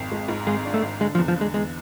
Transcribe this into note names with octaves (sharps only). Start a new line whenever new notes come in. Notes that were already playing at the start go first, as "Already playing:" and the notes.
Already playing: G#1 F2
G#3
G#2
G#1 G#3
D4
A3
G#1
D3 G#3
F3
E2
F3
D3
G#3
E2 G#3